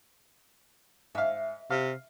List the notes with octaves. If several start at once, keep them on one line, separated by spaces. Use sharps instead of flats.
G#2 E5 F5
C3 F5